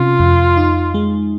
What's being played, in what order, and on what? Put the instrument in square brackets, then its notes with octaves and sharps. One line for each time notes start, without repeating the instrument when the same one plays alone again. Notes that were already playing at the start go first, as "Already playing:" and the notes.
Already playing: [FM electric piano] C3 C#4 [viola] F4
[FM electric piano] F2
D#4
G#3